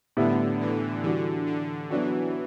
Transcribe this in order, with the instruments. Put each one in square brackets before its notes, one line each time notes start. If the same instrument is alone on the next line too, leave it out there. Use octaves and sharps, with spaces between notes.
[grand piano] A2 G3 B3 E4 [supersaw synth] D3
[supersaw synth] E3
[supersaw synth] D3 [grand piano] E3 G3 D4 F#4
[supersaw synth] D3
[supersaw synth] E3 [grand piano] F#3 B3 D4 F#4